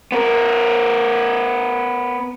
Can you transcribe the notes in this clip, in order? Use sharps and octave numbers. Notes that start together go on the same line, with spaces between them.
B3 A#4